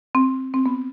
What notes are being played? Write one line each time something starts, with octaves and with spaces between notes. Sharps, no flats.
C4
C4
B3